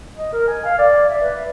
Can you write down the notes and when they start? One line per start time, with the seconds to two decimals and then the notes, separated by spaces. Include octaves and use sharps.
0.17 D#5
0.33 A#4
0.48 G#5
0.64 F5
0.78 D5
1.09 E5
1.22 B4